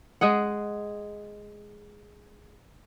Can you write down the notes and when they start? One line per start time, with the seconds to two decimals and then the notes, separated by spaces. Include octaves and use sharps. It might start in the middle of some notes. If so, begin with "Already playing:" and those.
0.21 G#3 G#4 F#5